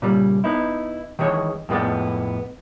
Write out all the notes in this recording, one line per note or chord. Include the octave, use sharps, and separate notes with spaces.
A#2 C#3 G3
B3 D#4 E4
D#3 E3 G#3 C#5
F2 A2 G#3 B3 D5